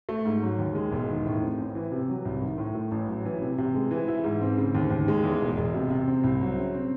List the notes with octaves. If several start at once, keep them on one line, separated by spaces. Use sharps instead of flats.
A3
G#2
F#3
D#2
G#3
E1
D#3
A2
C4
A1
E3
C3
F#3
C2
D#3
A2
A3
A1
F#3
E3
C3
C3
G#3
E3
E4
G#2
C4
C#3
D#2
D#2
G#3
E2
E1
E1
C3
C3
C4
C2
F#3
C#3
C4